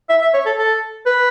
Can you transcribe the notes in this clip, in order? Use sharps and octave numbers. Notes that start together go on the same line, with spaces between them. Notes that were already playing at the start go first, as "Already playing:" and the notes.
E5
E5
C#5
A4
A4
B4